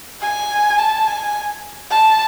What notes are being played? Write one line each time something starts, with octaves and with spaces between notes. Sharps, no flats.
G#5
A5
G#5
A5